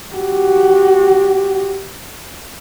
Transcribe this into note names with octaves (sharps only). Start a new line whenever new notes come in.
F#4 G4